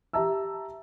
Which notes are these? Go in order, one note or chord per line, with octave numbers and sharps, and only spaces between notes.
G4 E5 A5 A#5 E6